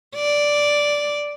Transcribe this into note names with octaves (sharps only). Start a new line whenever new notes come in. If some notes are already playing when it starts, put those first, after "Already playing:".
D5